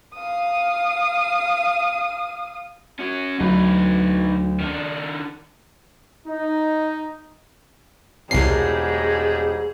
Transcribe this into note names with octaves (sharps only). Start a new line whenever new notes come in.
F5 D#6
C#4 F#4
D2 F#3 D#4 B4
D#3 D4
D#4
E1 C2 G#2 G3 G#3 G#4 C7